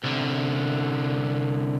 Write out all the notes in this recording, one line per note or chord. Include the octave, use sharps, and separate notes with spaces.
C2 D3